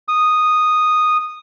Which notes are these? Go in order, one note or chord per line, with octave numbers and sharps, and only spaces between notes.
D#6